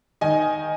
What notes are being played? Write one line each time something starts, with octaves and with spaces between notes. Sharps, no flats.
D#3 D#5 G#5